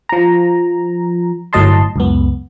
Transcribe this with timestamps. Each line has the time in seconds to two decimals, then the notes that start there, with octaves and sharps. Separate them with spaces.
0.09 F3 A#5
1.53 G1 A2 F#3 D#5 A5 C6
1.96 C#2 F#2 B3